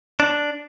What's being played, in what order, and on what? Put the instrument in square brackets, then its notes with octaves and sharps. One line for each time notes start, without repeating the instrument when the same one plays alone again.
[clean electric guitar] D4